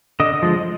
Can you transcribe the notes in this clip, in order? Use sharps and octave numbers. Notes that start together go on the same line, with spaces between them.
D3 D#5
F3 G#3